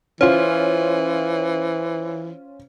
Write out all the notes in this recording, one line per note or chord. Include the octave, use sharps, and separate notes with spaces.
E3 C#4 F4 C5